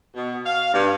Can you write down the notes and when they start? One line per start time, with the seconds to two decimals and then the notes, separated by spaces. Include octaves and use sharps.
0.15 B2
0.45 F5
0.73 G2